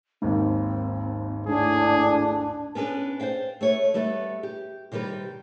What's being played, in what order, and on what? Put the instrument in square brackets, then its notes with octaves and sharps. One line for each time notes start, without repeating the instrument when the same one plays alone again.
[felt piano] G#1 D#2 G#2 [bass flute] C4
[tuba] A2 [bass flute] D4 [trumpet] G#4
[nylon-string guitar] B3 C#4 D4 F#4 B4
C5 D5 F5 G5
A3 B4 C#5
G3 A3 B3 B4 D5
G4
C3 D#3 G3 G4 B4